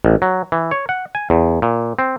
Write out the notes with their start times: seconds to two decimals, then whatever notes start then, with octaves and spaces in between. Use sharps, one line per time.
0.05 A1
0.22 F#3
0.52 E3
0.71 C#5
0.89 F#5
1.15 G#5
1.30 E2
1.62 A#2
1.99 C4